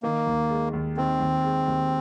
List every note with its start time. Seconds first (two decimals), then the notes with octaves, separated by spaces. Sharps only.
0.03 D#3 A#3
0.27 D#2
0.50 G#3
0.73 D#2
0.97 D#3 C4
1.20 D#2
1.44 G#3
1.68 D#2